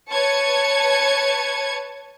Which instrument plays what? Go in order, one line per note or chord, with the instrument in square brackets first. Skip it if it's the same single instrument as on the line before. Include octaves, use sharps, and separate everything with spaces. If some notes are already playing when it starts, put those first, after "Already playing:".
[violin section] B4 C#5 A5 G#6 C#7